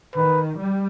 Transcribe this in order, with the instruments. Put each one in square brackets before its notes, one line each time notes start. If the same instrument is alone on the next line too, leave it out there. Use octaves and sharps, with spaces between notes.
[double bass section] D#3 [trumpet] B4
[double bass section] G3